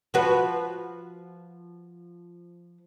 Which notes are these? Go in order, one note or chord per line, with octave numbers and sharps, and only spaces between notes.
F3 F#4 B4